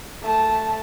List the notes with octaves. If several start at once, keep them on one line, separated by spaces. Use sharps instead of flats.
A3 A5